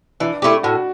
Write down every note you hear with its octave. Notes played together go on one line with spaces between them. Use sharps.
E3 D4
A3 E4 G4
A2 F#4